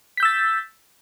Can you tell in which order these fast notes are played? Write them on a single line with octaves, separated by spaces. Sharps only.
B6 G6 E6 A6